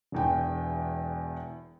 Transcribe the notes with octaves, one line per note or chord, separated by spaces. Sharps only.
E1 E2 G5